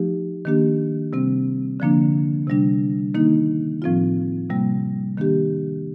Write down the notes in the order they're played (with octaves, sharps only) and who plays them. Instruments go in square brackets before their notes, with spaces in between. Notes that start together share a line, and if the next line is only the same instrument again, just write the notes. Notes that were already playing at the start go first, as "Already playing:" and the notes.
Already playing: [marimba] F3 A3 D#4 G4
D#3 A#3 D4 G4
C3 G3 C4
D3 F3 A#3 D4
C3 G3 D4
D#3 A#3 D#4
A2 F3 C4 F4
C3 G3 A#3
D#3 A#3 D4 G4